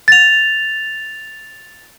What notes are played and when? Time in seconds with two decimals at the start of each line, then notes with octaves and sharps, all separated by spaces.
0.08 A6 F7